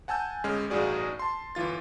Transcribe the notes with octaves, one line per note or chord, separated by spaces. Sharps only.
F#5 G#5 A5 E6 G6
G1 G#3 C#4 F6
A1 G2 D#4 F#4 G#4 D5
A5 C6
G1 E3 F4 A6